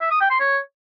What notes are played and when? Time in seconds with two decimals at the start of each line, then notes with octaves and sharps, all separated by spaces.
0.01 E5
0.11 D#6
0.21 G5
0.30 C6
0.40 C#5